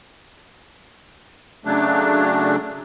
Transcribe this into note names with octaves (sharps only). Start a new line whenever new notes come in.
C#3 F#3 A3 D4